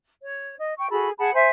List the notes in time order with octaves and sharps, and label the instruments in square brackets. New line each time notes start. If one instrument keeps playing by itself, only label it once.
[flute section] C#5
D#5
G5 C#6
F#4 G#4 A4 B5
G#4 F#5 A5 B5
C5 E5 G#5